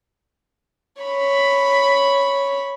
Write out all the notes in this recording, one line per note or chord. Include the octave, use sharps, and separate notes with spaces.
C#5 B5